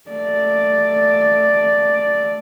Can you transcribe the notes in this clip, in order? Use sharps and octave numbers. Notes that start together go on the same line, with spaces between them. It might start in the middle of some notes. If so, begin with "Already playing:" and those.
A3 D5